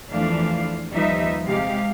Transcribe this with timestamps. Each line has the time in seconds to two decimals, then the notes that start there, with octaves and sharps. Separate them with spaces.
0.11 E2 E3 F3 A3 D4 F5
0.90 D#2 F3 G3 D#4 B4 E5
1.44 C3 G#3 G4 F5